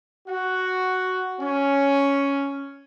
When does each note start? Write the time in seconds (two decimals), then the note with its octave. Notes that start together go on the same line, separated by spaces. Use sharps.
0.27 F#4
1.41 C#4